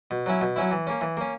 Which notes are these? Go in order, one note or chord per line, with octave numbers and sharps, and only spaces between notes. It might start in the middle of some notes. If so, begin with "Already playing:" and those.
B2
F#3 C#4 E4
B2
F#3 C#4 E4
E3
A#3 C#4
E3
A#3 C#4